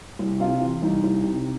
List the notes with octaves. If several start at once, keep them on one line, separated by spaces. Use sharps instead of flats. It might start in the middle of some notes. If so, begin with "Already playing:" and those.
C2
C3 F4
E3
C2 D#4
C2
C3